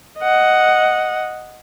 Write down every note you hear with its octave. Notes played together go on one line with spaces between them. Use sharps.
D#5 F#5